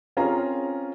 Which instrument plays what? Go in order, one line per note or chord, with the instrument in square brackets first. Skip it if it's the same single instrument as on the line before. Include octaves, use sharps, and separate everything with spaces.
[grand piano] C4 C#4 F4 G#4 A#4 A#5